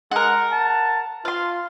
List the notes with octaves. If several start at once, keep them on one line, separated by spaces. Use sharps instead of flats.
G#3 A#4 F#5
A5
F4 F5 C6